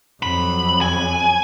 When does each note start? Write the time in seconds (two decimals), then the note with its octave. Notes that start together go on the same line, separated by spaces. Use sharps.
0.23 F2 F#3 B5
0.81 G#5